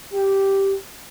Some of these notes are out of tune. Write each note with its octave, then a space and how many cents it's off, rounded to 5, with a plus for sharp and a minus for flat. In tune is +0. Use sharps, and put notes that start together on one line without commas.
G4 -5